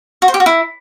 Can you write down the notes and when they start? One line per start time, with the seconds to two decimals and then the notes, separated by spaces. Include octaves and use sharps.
0.22 F#4
0.28 C5
0.34 G4
0.40 F#4
0.46 E4